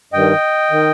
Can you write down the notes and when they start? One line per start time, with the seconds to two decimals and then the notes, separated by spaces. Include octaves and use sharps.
0.13 G2 D#3 D#5 G5
0.71 D#3